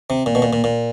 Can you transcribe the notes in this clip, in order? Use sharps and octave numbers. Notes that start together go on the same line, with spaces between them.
C3
A#2
B2
A#2
A#2
A#2